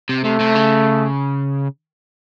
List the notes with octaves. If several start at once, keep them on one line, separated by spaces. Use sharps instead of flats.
C3
C3 A3
C3
C#3